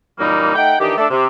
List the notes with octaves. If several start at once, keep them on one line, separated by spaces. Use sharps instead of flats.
F#2 A#2 E3 G3 A#3 D#4
A3 D#4 F#5 G5
D#3 E3 D4 D#4 G4
A3 D4 A4
C3